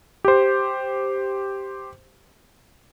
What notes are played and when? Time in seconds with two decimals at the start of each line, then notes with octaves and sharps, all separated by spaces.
0.25 G4 C5